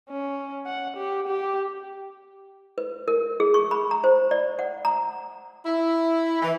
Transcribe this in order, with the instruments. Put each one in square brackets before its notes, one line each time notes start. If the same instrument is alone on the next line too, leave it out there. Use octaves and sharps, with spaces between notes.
[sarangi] C#4
F#5
G4
G4
[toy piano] B4
A#4
G#4
C#6
B5
A#5
C5
D5
F#5
A#5
[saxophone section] E4
E3